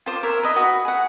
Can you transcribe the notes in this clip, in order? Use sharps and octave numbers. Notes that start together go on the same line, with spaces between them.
F4 C5 D6
A#4 C#5 E5
B4 D#5 E5
F#4 B5 D#6
G#4 F#5